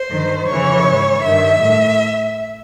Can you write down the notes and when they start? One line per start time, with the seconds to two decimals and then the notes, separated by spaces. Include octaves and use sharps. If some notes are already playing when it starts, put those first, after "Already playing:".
Already playing: C5
0.09 G2 D#3
0.47 F2 C#3 E3 C#5
0.85 G#2 E3
1.23 G2 D#3 E5
1.61 A2